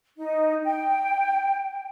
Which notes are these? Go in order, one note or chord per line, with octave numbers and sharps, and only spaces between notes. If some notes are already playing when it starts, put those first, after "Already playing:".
D#4
G5